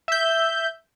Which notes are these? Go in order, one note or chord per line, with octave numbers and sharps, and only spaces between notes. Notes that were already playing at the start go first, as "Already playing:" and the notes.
E5 G6